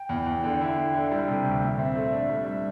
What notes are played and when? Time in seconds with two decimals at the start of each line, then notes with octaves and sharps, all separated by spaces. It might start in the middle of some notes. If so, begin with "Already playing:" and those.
Already playing: G5
0.09 E2
0.26 E2
0.43 D3
0.61 E4
0.77 E4
0.94 D3
1.11 G3
1.28 C3
1.45 D2
1.62 A#2 E5
1.78 C4 E5
1.95 A3
2.12 D4
2.29 G3
2.46 G3